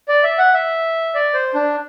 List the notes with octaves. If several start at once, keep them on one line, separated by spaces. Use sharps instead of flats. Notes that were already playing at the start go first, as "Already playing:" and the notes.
D5
E5
F#5
E5
D5
C5
D4